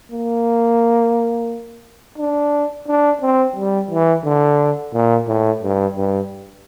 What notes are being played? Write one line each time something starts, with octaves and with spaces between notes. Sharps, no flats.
A#3
D4
D4
C4
G3
E3
D3
A#2
A2
G2
G2